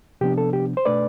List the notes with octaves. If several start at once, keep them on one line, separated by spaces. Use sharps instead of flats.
C3 F3 B3 D4 G4
A4
G4
C5
B2 A3 D4 B4 D5